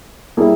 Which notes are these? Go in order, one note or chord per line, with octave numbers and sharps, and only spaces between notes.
G3 A#3 E4 G#4